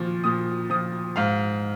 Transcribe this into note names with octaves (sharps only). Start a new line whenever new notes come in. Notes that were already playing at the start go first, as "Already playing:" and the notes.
Already playing: A#2 F3 C#6
A#2 D#6
F3 D#6
G#2 F5